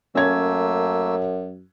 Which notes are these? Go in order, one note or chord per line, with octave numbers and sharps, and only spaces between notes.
F#2 A3 A#3 C#4 E6 G#6